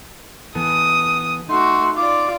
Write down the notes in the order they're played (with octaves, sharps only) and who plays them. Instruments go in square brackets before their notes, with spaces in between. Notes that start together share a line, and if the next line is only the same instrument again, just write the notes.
[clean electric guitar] E3 B3 A4 [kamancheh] D#6
[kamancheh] A3 F#4 [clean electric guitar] D#4 [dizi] C6
[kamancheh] F4 D5 [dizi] D6